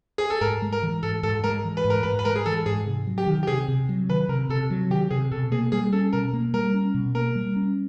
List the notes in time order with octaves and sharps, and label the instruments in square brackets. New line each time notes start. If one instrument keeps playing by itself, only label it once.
[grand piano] G#4
A4
[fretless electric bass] G#2 [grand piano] A#4
[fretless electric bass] G#3
[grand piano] A#4
[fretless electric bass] E3
[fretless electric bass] G#2 [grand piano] A4
[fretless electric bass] G#2 [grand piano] A4
[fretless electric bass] G#3 [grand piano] A#4
[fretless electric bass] E3
[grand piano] B4
[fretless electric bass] G#2
[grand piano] A#4
[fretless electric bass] G#2 [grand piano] B4
[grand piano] B4
[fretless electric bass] G#3 [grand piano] A#4
[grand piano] G#4
[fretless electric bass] E3 [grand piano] A4
[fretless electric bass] G#2 [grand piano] G#4
[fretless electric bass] C3
F#3
[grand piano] G4
[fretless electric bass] D#3
[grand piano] G4
[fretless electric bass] C3 [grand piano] G#4
[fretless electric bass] C3
F#3
[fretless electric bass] D#3 [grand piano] B4
[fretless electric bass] C3 [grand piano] A#4
[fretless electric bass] C3 [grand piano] A4
[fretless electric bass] F#3
[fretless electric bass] D#3 [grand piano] G4
[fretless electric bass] C3 [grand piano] G#4
[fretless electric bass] B2 [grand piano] A4
[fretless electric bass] A#3 [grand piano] G#4
[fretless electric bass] G3 [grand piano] G#4
[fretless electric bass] C#4 [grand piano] A4
[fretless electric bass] B2 [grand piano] A#4
[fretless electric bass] A#3
[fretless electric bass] G3 [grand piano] A#4
[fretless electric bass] C#4
B2
[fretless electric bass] A#3 [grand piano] A#4
[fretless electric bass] G3
C#4